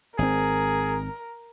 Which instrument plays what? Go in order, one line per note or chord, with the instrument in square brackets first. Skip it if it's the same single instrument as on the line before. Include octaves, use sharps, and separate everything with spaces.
[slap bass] G#1 C4 [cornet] G#4 [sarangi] A#4